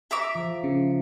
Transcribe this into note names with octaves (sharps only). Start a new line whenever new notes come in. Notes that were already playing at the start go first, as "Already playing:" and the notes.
E5 A#5 D6
F3
C#3